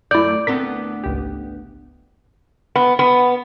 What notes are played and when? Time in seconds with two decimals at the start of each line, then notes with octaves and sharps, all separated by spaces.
0.11 F#2 A3 E4 D5 G6
0.47 D2 B3 C4 A4 A#4 B6
1.04 G#1 C#2 G4
2.76 B3
2.99 B3